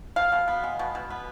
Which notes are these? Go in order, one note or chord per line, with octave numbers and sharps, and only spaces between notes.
B2 F5
B2
B3
G#3
B2
B2
B3